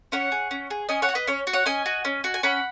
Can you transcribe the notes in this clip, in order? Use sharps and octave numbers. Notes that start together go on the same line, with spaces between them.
C#4 C#5 F#5
G#4
C#4
G#4
C#4 D#5 G#5
C#5 F#5
F#4
B4 D#5
C#4 C#5
F#4
C#5 F#5
C#4 D#5 G#5
F#4
C#4
F#4
G#5
C#4 F#5 B5